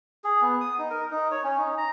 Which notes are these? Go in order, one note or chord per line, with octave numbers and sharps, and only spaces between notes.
G#4
B3
D#6
D#4
A#4
D#4
C#5
C#4
D#4
A#5